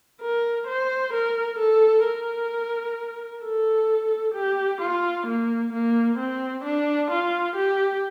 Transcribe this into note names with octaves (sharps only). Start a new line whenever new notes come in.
A#4
C5
A#4
A4
A#4
A4
G4
F4
A#3
A#3
C4
D4
F4
G4